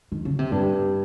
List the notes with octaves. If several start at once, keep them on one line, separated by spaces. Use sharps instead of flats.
D#3
C#3
C3
G2